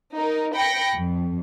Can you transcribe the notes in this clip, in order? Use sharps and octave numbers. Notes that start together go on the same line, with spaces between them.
D#4 A#4
G5 B5 A#6 C#7
F2